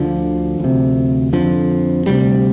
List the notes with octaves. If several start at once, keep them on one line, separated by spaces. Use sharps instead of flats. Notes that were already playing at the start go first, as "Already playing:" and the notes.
Already playing: D2 D3 F3
D2 C3
F2 D3 F3
D2 C3 G3